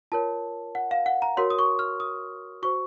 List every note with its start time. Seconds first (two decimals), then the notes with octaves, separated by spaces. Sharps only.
0.12 F4 A#4 C#5 A5
0.75 F#5
0.91 F5
1.06 F#5
1.22 A#5
1.37 F#4 A#4 C#5 C6
1.50 D#6
1.59 C#6
1.79 F6
2.00 D#6
2.62 F#4 C5 C#6